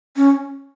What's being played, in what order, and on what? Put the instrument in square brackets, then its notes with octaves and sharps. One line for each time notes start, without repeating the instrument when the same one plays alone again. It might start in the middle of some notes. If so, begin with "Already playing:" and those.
[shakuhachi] C#4